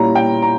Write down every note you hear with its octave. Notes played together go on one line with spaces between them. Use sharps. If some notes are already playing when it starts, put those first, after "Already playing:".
Already playing: A#2 G3 C#4 E4 A#5
G5
A#5